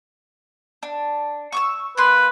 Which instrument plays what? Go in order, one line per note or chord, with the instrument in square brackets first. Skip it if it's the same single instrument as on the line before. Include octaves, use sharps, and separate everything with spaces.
[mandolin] D4
C#6 D6 E6
[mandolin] A#3 C6 [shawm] B4